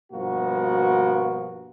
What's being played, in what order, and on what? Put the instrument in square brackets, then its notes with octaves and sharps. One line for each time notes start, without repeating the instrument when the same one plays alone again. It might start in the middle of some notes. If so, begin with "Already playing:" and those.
[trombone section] G2 B2 F3 A#3 F#4